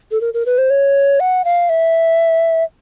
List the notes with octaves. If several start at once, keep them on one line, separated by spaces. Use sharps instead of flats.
A4
A#4
A#4
B4
C5
C#5
F#5
F5
E5